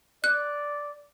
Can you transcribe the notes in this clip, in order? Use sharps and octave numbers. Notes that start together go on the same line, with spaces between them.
D5 F#6